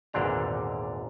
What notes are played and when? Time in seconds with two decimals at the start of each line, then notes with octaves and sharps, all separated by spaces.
0.13 G#1 E2 A#2 D3 D4 A#5